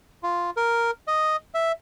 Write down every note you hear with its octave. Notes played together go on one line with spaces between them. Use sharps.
F4
A#4
D#5
E5